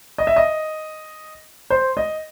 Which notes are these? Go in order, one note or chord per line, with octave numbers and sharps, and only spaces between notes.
D#5
E5
D#5
C5
D#5